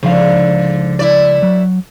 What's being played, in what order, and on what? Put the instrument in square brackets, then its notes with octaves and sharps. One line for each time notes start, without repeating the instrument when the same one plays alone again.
[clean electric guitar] C#2 F3 F5 [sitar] G#2 D3
[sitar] A3 E4 D5
[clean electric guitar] F#3